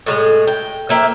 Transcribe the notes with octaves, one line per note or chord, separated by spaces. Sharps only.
A2 F#3 G#3
G5
F3 A#3 E5 G5